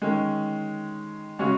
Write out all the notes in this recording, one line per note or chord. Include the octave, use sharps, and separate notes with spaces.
D#3 G#3 C#4
C#3 G#3 C#4 F#4